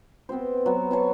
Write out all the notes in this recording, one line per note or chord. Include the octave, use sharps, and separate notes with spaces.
B3 C4 G4 C5
F#3 B3
C5 C#5 A5 C#6